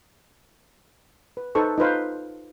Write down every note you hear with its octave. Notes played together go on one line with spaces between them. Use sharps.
B4
D#4 A4 B4 C5 C#6
D#4 F4 B4 C5 F5